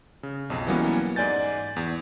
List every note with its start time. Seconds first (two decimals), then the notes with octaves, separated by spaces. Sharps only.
0.23 C#3
0.50 B1 F2
0.67 E3 F#3 G3 A#3 B3 C#4
1.16 G#2 D5 G#5 G6 A6
1.76 E2